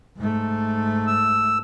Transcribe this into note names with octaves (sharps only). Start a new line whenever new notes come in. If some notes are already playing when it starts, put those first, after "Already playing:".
G#2 A3
E6